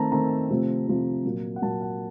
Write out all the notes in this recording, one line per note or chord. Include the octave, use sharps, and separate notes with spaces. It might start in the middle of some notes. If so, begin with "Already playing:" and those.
Already playing: D#3 A3 C4 A5 A#5
D#3 A3 C4 A#5
C3 F3 A3 C4
C3 F3 A3 C4
A#2 F#3 A#3
F#5
A#2 F#3 A#3 A5
F#5